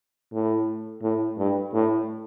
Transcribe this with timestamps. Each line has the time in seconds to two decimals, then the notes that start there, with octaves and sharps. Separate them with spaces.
0.33 A2
1.02 A2
1.38 G2
1.73 A2